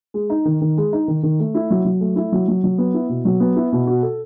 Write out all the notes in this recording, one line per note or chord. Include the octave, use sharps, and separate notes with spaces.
G#3
D#4
D#3
D#3
G#3
D#4
D#3
D#3
A3
E4
F#3
F#3
A3
E4
F#3
F#3
F#3
B3
E4
B2
F#3
B3
E4
B2
F#4
A4